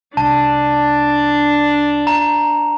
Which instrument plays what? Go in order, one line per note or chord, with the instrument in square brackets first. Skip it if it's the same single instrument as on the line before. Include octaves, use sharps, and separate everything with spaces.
[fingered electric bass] C2 [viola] D4 [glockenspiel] A5
[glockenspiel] A#5